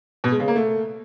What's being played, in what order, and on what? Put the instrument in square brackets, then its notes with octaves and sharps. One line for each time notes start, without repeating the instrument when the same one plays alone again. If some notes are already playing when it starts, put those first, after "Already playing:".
[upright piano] B2
G#3
C#3
A#3
A3